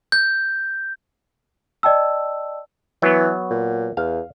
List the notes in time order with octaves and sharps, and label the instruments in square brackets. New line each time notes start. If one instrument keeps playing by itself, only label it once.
[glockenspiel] G6
[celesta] D5 D#5 G5 A5 E6
[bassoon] E3 [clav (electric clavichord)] F#3 B3
[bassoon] A#2
[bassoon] E2 [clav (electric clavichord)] F5